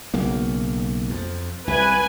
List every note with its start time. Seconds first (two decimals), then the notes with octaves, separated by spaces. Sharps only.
0.14 B1 C#3 A#3
1.10 F2
1.68 C2 B4 G#5